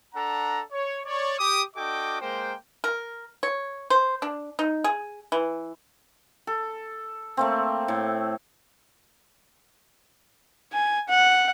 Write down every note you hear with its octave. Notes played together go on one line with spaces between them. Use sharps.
D4 A4 F#5 A#5
C#5
C#5 D5
G4 D6 D#6
D4 F#4 A4 D#5 G5 D6
G#3 A#3 A#4 C5 G5
A#4
C#5
C5
D4
D#4
G#4
E3
A4
A3 A#3 C4
A2
G#5
F#5